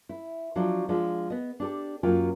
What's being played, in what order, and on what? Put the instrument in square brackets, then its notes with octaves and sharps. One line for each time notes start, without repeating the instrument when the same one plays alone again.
[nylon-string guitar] E4
F3 F#3 D4
F3 G#3 D4
B3 D#5
D4 G4 A4
F#2 F#3 A#3 F4 G5